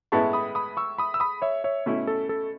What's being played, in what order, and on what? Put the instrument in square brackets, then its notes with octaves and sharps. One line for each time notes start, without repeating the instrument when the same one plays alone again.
[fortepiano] A2 G#3 B3 E4 [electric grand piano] A5 C#6
[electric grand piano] B5 D#6
B5 D#6
C#6 E6
B5 D#6
E6
B5 D#6
C#5 E5
C#5 E5
[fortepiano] B2 A3 C#4 E4
[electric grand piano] A4
A4